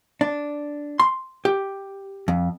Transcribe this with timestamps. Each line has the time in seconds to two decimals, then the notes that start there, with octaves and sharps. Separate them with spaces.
0.21 D4
1.00 C6
1.45 G4
2.28 F2